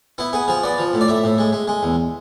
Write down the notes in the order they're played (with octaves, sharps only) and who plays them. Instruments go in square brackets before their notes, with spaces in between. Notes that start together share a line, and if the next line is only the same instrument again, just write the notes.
[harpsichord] B3 E4
B3 G#4
F3 G#4
B3 D5
F3
A2
D5
A2 E5
A2
G#3
G#3
G#3
E2